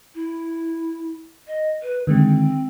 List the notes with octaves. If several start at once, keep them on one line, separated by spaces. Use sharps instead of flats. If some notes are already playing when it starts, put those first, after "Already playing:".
E4
D#5
B4
D3 D#3 G#3 C4